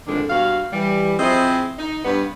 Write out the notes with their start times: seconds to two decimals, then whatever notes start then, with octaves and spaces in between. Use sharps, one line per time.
0.07 F2 A2 D3 D#3 G#3 D4
0.30 G2 B2 F#4 F5
0.73 E3 G3
1.19 F3 C4 E4 G#4 D#5
1.78 D#4
2.04 G2 B3